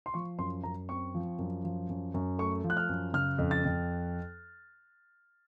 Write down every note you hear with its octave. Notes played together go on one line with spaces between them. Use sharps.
C6
F3 C#6
F#2 C6
F#2 A#5
C4 C#6
F3
F#2
F3
F#2
F#2
A3 C#6
F3
F#6
F6
F#2
C#3 F6
F2
A6
F2